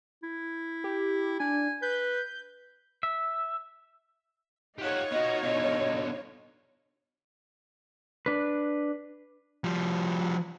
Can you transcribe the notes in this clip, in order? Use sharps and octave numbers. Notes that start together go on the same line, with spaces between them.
E4
G4
D4 G#5
B4 G6
E5
D#4 F4 G4 C#5 F#5
B3 F#4 D#5
B2 D3 D#5
D4 B4
F3 G3